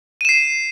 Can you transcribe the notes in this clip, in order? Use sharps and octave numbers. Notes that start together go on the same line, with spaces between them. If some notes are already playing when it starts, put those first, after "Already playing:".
C7 D#7 E7